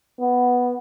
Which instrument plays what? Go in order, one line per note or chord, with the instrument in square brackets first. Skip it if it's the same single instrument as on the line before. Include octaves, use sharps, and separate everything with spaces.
[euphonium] B3